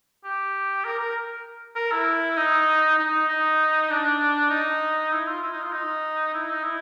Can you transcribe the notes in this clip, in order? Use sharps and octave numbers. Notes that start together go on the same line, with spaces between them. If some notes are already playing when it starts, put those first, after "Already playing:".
G4
A#4
A#4
A#4
E4
D#4
D#4
D#4
D4
D#4
E4
F4
E4
D#4
F4
D#4
E4
D#4
E4